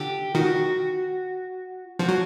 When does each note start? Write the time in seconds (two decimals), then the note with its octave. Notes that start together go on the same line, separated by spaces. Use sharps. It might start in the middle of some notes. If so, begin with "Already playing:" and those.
Already playing: D3 G4
0.35 D#3 F#4
1.99 F3 F#4
2.09 F#3